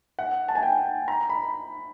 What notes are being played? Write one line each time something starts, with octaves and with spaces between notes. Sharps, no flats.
F#5
A5
G#5
G5
A#5
B5